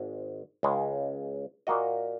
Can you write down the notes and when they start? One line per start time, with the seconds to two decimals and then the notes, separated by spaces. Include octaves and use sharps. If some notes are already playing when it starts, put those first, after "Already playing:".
Already playing: G#1 G#2 G#3
0.63 C#2 C#3 G#3
1.67 A#2 A#3 F#4 D#5